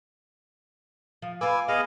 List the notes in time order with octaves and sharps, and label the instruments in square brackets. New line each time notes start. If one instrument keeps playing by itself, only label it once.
[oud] F3
[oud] F4 B4 [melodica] G#5 D6 E6
[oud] B3 [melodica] G#4 D#5 F5